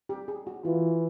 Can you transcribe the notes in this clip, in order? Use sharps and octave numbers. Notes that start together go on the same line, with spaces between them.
G4
G#4
F#4
E3 F4